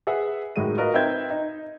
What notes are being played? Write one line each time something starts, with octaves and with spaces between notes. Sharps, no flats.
G#4 B4 E5 F#5
A2 D#3 G#3 F#4 D#5 D#7
F4 F#4 A#4 B4 D#5
C4 D#4 B4 E5 G6 G#6
D#4